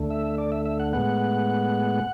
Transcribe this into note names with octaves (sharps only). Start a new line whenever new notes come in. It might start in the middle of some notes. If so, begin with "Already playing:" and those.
Already playing: D2 D3 A3
E5
D5
E5
E5
F#5
A2 G#3 B3 F#5